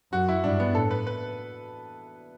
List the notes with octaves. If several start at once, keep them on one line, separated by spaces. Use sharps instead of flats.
F#2 F#4
E4
G2 D4
B3
A2 A4
B4
B4